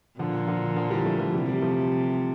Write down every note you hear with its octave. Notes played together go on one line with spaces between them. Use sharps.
A#2 D3 F3
D3 F3
D3 F3
E3 G3
F3 A3
F3 A3
C3 E3 G3
E3 G3
F3 A3